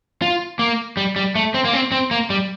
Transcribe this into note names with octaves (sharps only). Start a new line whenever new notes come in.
F4
A#3
G3
G3
A3
C4
A#3
C4
C4
A#3
G3